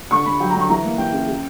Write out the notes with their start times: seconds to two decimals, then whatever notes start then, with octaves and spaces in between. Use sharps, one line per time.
0.11 D3 C#6
0.26 D3 B5
0.40 F#3 G5
0.50 A#5
0.54 D3
0.60 C#6
0.69 E3 A#5
0.84 A#3
0.98 E3 G5
1.13 C#3
1.28 C#3